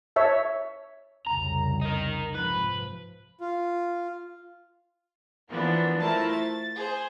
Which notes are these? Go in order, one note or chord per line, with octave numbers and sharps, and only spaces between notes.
C#5 E5 A5
C2 F2 C#3 A#5
D#4 A#4
G#2 C3 F3 B4
F4
E3 F3 A#3 B3 D4
A3 E4 F4 A#4 C5 A5
A6
G#4 C5